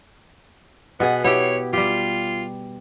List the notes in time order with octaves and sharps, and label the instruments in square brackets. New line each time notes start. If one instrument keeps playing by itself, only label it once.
[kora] B2 G#4 F#5 [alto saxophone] B3
[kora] B3 E4 G4 [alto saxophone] C#5
[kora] G3 G4 [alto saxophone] F4